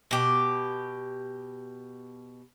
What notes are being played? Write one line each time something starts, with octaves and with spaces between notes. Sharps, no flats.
B2 G4